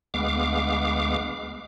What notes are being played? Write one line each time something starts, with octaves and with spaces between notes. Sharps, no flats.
D2 G#3 B3 F5 D6